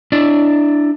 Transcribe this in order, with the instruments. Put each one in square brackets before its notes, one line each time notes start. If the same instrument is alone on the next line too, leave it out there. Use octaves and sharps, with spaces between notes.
[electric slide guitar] D4 E4 D5